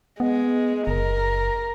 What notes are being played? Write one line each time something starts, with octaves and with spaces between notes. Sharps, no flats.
G#3 B3
F#1 A#4